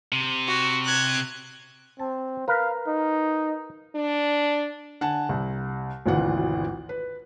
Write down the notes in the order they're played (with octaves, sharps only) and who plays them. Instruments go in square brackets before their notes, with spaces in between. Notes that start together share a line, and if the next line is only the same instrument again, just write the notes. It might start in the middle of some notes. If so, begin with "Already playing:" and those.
[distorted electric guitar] C3
[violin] F#4
F#6 G#6
[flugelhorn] C4 [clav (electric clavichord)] A5
[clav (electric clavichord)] A#4 B4 [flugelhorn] F5
[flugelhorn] D#4
[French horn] D4
[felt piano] D3 F#5 G#5 A5
C2
G#1 D2 B2 E3 F4 F#5
B4